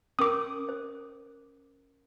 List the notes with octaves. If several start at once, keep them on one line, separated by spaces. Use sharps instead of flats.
C#4 A#4 D6 D#6
C5